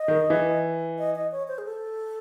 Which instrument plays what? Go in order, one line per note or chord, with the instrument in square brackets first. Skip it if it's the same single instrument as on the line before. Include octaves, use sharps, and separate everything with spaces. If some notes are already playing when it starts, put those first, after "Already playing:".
Already playing: [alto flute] D#5
[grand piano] D#3
E3
[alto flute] D#5
D#5
C#5
C5
G#4
A4